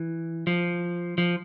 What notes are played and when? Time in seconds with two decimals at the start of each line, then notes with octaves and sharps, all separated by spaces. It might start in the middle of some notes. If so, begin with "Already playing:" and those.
Already playing: E3
0.47 F3
1.18 F3